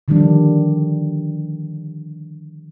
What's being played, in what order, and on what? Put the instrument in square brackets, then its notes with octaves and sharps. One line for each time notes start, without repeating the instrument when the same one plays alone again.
[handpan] D3 D#3 F3 G3 D4